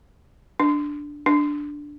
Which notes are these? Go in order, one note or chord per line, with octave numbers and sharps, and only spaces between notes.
D4
D4